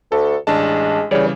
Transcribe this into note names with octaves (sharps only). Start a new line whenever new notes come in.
D2 A4
A1 G#3 D4 A5
C#3 E3 G3 G#4 C#5 D5